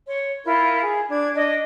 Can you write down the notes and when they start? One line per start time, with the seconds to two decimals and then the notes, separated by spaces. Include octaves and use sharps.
0.06 C#5 C6
0.44 E4 F4 A#4
0.81 G#4
1.09 D4 G#6
1.35 D4 D#5